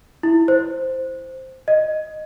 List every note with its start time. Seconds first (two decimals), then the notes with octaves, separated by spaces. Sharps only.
0.23 E4
0.48 C5
1.68 D#5